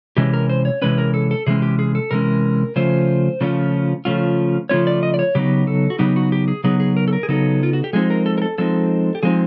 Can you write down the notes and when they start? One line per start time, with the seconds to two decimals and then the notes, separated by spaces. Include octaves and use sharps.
0.17 C3 E3 G#3 C#4 G4
0.34 A#4
0.49 C5
0.65 C#5
0.82 C3 E3 G#3 C#4 B4
0.98 A#4
1.14 A4
1.31 A4
1.47 C3 E3 G#3 C#4 G#4
1.62 G4
1.79 G#4
1.95 A4
2.11 C3 E3 G#3 C#4 A#4
2.76 C#3 F3 A3 C#4 F4 C5
3.41 C#3 F3 A3 C#4 F4
4.05 C#3 F3 A3 C#4 F4
4.69 C#3 F3 A3 C#4 F4 C#5
4.87 D5
5.03 D#5
5.14 D5
5.19 C#5
5.35 C#3 F#3 B3 D#4 G4
5.67 A4
5.90 F#4
5.99 C#3 F#3 B3 D#4 G4
6.16 F#4
6.32 G4
6.48 G#4
6.64 C#3 F#3 B3 D#4 G#4
6.80 G#4
6.97 A#4
7.08 A4
7.13 A#4
7.23 G#4
7.29 C#3 F#3 B3 D#4 A4
7.63 F4
7.73 F#4
7.84 G4
7.93 F3 G#3 C4 D#4 G#4
8.10 A#4
8.26 A4
8.38 A#4
8.42 A4
8.58 F3 G#3 C4 D#4 A4
9.15 G4
9.23 F3 G#3 C4 D#4 G#4